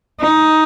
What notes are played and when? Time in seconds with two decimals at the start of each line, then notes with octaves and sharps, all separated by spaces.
0.21 D#4